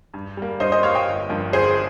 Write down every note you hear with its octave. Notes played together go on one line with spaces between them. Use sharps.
G2
G3 A#3
G2 C5 D#5
C5 D#5
G3 A#3 C#5 F5
D#5 G5
G1
G2 F3 A#3
G1 G#4 C5